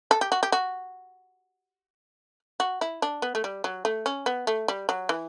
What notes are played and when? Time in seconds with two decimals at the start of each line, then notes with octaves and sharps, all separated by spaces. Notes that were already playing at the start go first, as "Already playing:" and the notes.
0.11 A4
0.21 G4
0.32 F#4
0.43 G4
0.52 F#4
2.60 F#4
2.81 E4
3.02 D4
3.22 B3
3.35 A3
3.44 G3
3.64 F#3
3.85 A3
4.06 C#4
4.26 B3
4.47 A3
4.68 G3
4.89 F#3
5.09 E3